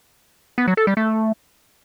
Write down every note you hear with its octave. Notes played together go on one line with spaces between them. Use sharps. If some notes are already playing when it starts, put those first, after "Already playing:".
B3
F#3
A4
G3
A3